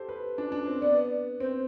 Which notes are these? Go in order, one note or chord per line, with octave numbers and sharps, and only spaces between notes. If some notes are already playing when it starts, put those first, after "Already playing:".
Already playing: G4 A4 C5
B4
D4
D4
C4
B3 D5
C4 C5